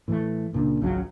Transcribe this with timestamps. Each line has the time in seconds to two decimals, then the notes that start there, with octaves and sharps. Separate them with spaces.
0.08 A2 E3 G3 A3
0.53 C#2 A#2 C#3 D4
0.81 G#1 C#2 C#3 F#3